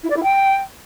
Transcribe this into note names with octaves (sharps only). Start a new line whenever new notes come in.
E4
D5
E4
G5